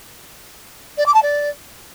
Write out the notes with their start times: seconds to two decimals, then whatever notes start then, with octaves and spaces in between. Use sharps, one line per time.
0.97 D5
1.06 D6
1.14 A5
1.22 D5